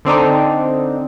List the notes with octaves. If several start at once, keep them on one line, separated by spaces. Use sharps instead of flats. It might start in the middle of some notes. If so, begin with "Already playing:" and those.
D3 C4 D4 D#4